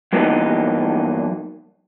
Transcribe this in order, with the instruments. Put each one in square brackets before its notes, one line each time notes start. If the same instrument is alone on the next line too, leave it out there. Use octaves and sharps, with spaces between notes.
[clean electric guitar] G2 E3 F#3 A#3 B3 D#4